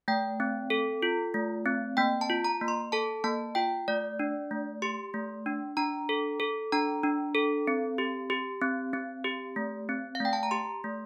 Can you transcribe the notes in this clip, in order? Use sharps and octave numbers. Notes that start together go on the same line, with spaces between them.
A3 G5
C4
A4
F4
A3
C4
A#3 G5
A5
F4
A#5
A#3
C6
A4 A5
A#3 A5
F4 G5
A3 D5
D4
A3
G4 C6
A3
D4
D4 A#5
A4
A4
D4 A#5
D4
A4
C4
G4
G4
C4
C4
G4
A3
C4
F5
A3 G5
A5
A#5
G4 C6
A3